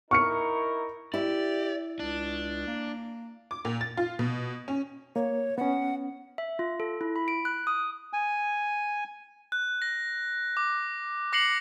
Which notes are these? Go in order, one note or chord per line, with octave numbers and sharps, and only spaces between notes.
D#4 E4 A#4 C#6 F6 C#7
E4 G4 D5
C#2 D4
A#3
D6
A#2
A6
F4
B2
C#4
A#3 C#5
B3 C#4 F#5
E5
F4
A4
E4
B5
D7
F#6
D#6
G#5
F#6
A#6
D6
D6 A#6 C7 C#7 F#7